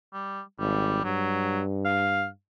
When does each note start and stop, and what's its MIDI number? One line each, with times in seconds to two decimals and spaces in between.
0.13 0.41 55
0.60 1.03 32
0.60 1.04 55
1.04 2.30 43
1.04 1.60 54
1.85 2.25 77